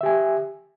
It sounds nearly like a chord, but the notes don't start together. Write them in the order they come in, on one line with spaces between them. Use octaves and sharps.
E5 G4 G#5